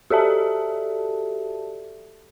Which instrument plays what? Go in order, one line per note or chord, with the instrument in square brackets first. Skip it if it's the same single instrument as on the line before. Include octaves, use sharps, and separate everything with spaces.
[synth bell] F#4 G4 A4 D5 E5 A5